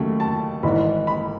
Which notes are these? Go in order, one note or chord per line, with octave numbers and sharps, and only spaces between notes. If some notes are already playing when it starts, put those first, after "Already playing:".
Already playing: D#2 C#3 F#3 A3
A5
G#1 G#2 E3 B5
B5